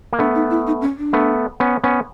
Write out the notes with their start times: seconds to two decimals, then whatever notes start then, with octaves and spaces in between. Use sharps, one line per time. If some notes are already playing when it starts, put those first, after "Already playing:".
0.13 A#3
0.19 A3 B3 D4
0.35 D#4
0.50 E4
0.67 D#4
0.81 C#4
0.98 D4
1.13 A3 B3
1.60 B3 C#4
1.84 B3 C#4